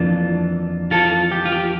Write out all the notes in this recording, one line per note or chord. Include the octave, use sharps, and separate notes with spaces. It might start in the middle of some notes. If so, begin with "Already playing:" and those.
Already playing: F2 E3 A#3 D4 F4
F4 A4
G4
F4
G4